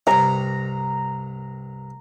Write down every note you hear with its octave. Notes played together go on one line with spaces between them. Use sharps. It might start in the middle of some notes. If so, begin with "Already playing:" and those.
C2 G2 A#5